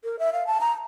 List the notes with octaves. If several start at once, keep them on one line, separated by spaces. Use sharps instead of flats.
A#4
E5
F5
A5
A#5